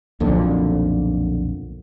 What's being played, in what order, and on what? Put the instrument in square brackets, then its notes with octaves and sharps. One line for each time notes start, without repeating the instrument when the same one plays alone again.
[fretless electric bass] B1 F2 A#2 D3